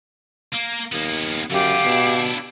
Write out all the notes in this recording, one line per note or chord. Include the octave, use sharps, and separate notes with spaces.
A#3
D#2 A#3 B3
F#2 D3 B3 G4 F5
B2 D4 E4